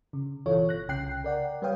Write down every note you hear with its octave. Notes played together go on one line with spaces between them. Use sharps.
C#3
G1 B2 E3 F4 A4 C#5
F#6 A#6
C2 C#3 G5 F#6 C7
A#4 D5 F#5 G5
G3 B4 C#5 F5 G5 D#6